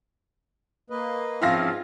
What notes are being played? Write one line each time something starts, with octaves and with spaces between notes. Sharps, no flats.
A#3 B4 D#5
G#2 F3 C4 C#4 F4 E5 F5 A#6